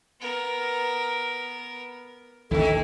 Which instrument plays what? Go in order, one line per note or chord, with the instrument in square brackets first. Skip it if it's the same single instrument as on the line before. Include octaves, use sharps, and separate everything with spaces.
[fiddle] B3 A#4
[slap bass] A1 D#2 D3 [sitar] D#3 A3 E4 [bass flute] A4